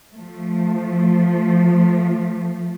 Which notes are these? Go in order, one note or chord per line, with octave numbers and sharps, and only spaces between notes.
F3 A3